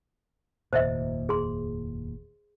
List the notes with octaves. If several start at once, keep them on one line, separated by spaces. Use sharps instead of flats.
F1 D#2 A#2 C5 D#5 E5
G#4 C6